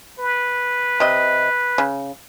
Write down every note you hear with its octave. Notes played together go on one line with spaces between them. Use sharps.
B4
C3 D#5
C#3